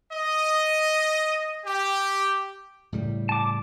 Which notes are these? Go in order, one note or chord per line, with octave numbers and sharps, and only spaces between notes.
D#5
G4
A2 C#3 G3
A5 D6